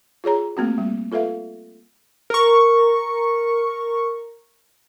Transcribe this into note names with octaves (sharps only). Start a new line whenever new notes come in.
F4 G#4 C#5 A#5
A3 A#3 C4 F#4
G3 A#3
F4 A4 B4 E5 F5
A#4 C#6